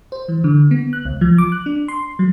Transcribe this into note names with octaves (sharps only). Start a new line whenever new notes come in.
C5
E3
D3
B3
F#6
C#2
F3
D6
F#6
D4
C6
F#3